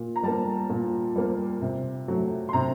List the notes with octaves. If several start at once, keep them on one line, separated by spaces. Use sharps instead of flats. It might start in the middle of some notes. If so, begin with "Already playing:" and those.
Already playing: A#2
A#5
G3 A#3 A5
A#2
G3 A#3
C3
F#3 A3
C6
C3 A#5